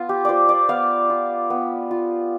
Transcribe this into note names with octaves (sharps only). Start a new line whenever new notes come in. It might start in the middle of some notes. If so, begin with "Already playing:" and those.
Already playing: B3 F4
G4
F4 C5 D5
D5
B3 F5
F4
B3
F4